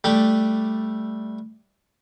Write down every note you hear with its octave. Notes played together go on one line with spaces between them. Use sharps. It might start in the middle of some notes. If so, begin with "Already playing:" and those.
G3 A3 D4 G4 A4